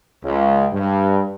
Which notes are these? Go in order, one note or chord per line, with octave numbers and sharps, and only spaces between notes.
C#2
G2